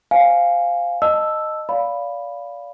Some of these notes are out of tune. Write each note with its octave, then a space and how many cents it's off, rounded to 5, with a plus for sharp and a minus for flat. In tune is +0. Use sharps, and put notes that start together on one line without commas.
C5 +0 F5 +0 G#5 +0
D#5 -10 A5 +0 E6 +0
D5 -35 F5 +0 B5 +0